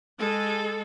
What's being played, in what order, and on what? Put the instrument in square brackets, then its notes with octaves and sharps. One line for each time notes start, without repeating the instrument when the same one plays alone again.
[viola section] G#3 A4